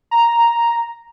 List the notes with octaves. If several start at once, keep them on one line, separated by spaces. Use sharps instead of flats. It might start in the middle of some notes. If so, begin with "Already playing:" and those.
A#5